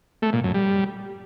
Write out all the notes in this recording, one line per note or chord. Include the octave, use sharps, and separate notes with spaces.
A3
A#2
F#2
G3